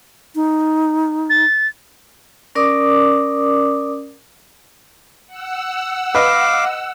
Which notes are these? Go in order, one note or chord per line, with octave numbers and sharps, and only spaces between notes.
D#4
A6
C#4 A#4 D5 D6 D#6
F#5 E6
B4 D#5 F5 D6